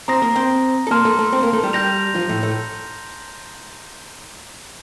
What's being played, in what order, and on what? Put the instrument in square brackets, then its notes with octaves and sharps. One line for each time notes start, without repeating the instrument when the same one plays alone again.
[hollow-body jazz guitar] C4 C5 [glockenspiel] A#5 D#6 A#6
[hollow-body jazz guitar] A#3 A#4
C4 C5
A4
[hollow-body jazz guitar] A#3 A#4 [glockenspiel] A5 C6 F6
[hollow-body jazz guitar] A3 A4
A3 A4
C4 C5
A#3 A#4
A3 A4
G3 G4
[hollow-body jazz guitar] G3 G4 [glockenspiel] G6 A#6 F7
[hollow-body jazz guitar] F3 F4
A2 A3
A2 A3